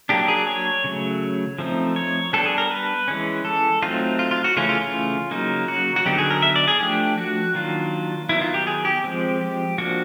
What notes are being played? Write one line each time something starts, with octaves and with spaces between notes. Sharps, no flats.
F#3 A#3 D4 G4
G#4
C#5
C#3 F#3 A3
F3 A3 C4 D#4
C#5
G3 B3 D4 A4
G#4
A#4
B4
E3 G#3 C#4
A4
F#3 A3 C4 D#4 F4
F4
F4
F#4
C#3 E3 A3 C#4 F4
F4
F4
C#3 F#3 A#3 D#4
F#4
F#4
D3 F#3 B3 D#4 G4
G#4
A#4
E5
D5
G#4
F3 A3 D4 G4
F#4
D#3 F#3 A#3 D4 F4
D#3 F#3 B3 D#4 E4
F4
G4
G#4
G4
F3 G#3 C4
G4
F3 A#3 D4 F#4